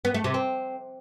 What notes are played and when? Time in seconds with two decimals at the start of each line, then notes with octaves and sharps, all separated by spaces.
0.05 B3
0.14 A3
0.24 C3
0.34 C4